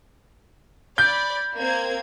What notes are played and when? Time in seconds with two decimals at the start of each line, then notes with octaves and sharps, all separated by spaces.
0.98 D5 B5 G6
1.58 A#3 C4 G#6